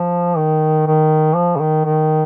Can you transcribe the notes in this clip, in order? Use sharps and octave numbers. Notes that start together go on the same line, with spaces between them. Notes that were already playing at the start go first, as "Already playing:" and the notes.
Already playing: F3
D#3
D#3
F3
C#3
D#3
D#3